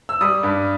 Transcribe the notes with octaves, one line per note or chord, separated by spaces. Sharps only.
E6
G3 D#6
G2